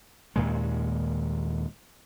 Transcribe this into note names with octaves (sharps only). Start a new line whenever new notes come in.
D#2 A#2 G#3